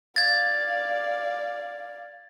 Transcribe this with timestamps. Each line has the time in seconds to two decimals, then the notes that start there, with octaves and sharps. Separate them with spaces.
0.16 D5 F5 G#6 A6